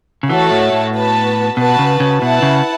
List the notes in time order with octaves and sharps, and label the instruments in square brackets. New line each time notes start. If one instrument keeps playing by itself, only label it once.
[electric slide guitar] C#3
[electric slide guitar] E3 [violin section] A3 F#4 A4 C#5 A5
[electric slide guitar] A2
A2
[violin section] B3 F#4 B4 A5
[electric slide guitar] B2 [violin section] F#4 B4 A5
[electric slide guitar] C#3
C#3
[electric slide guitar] B2 [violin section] E4 B4 F#5 A5
[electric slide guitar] C#3